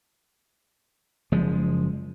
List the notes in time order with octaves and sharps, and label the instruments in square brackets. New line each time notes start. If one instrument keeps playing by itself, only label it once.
[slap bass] F#1 F3 G#3